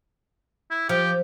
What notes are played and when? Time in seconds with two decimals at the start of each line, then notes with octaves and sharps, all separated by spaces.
0.71 E4
0.89 F3 G4